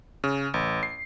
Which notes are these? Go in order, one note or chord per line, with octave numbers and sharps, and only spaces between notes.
C#3
A1
C7